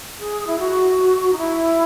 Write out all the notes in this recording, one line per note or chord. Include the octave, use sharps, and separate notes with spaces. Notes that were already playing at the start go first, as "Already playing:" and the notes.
G#4
E4
F#4
D#4
E4